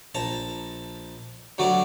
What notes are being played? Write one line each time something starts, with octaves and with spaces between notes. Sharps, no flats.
A#1 A5 A#5
D2 F#3 F#4 D5 D6